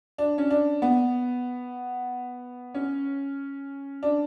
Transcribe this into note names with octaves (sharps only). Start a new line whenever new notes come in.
D4
C#4
D4
B3
C#4
D4